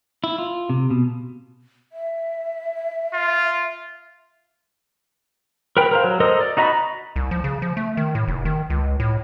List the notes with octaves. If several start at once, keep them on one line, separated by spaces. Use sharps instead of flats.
E4
F4
C3
B2
E5
F4
A#4 B4 G5
A#4 C5 F5
F#3
A4 A#4 C5 D#5
D5
D#4 F#4 D#5 A#5 B5
C2
F3
C#3
F3
A3
D#3
A2
F1
D#3
C#2
A2